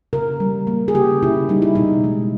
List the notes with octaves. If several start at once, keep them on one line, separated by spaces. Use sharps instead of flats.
C#3 A#4
G3
A#3
G#4
C#3 G4
C#3 E4
G3 D#4
E4
B2 D#4
G#3